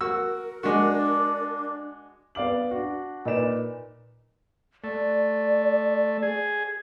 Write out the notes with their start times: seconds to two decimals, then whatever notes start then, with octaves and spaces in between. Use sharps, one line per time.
0.01 F#4 A#4 E6
0.63 G#3 D4 F#4
2.35 B3 D5 F5 D6 F#7
2.71 D4 F#4
3.25 A#2 D#4 B4 D5 E7
4.84 A3 D5
6.23 G#4